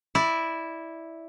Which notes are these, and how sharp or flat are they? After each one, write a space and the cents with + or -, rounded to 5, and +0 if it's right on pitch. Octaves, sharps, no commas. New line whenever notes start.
E4 -5 D5 +5